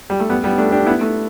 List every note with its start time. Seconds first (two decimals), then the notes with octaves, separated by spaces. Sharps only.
0.10 G3
0.20 A3
0.29 G3 B3
0.44 G3 B3
0.58 A3 D4
0.72 D4 G4
0.86 B3 E4
1.01 A3